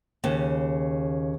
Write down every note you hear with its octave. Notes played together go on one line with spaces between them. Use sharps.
D#2 C#3